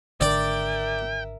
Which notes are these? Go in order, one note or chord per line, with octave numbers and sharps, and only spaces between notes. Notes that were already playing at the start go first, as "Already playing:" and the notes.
G#1 D3 A#4 D5 E5 G5